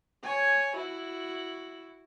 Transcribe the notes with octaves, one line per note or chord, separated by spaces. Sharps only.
C#5 G#5
E4 F#4